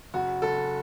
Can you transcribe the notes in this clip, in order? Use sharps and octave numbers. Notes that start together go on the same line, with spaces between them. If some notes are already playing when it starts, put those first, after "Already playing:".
F#1 F#4
F#1 A4